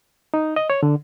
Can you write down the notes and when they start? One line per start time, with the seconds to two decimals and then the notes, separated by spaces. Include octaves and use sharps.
0.34 D#4
0.56 D#5
0.70 C#5
0.83 D3